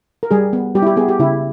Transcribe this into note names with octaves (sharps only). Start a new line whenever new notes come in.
A#4
G3 G#4
B3
G3 G4
E4
G4
B3 G#4
G4
C#3 E4